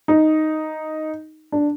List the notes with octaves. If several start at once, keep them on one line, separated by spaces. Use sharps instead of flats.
D#4
D4